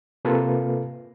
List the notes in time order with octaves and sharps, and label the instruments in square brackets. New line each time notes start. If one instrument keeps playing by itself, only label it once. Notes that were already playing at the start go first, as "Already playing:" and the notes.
[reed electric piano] C3 A#3 F4 A4 B4